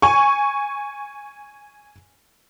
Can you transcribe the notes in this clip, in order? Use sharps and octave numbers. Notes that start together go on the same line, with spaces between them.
G#5 C#6